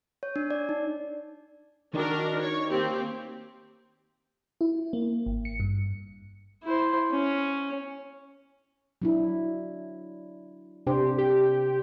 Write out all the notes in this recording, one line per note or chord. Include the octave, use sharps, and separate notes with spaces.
C#5
D4
D5
D#4
D#3 D4 F#4 A#4
C#5
A#3 C4 G4
E4
A#3
G#1
C#7
G2
E4 C5
C#4
F#3 D4 E4
C3 D4 G4 C5
G4